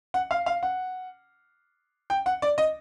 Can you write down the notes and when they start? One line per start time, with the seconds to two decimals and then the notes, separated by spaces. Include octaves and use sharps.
0.14 F#5
0.31 F5
0.46 F5
0.63 F#5
2.10 G5
2.26 F#5
2.42 D5
2.58 D#5